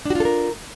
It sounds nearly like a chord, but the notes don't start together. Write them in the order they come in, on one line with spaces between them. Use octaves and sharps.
D4 F#4 F4 A4 A#4